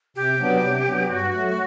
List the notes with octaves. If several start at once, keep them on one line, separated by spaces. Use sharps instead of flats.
C3 G4
F#3 B3 D4
C3
F#3 B3 D4
G2 F#4
F#3 A3